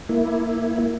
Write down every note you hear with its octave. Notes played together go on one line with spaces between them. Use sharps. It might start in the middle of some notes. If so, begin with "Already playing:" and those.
A#3 E4